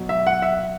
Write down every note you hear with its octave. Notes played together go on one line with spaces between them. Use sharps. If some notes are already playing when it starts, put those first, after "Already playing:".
Already playing: B2 F#3
E5
F#5
E5